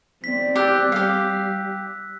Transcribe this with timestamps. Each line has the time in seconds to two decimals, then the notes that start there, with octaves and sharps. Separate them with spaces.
0.24 C4 D5 B6
0.56 G4 E6 F#6 G6
0.92 G3 G4 F5